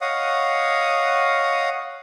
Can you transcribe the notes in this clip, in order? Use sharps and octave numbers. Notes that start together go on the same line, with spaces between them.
C#5 D#5 F5 F#5 D#6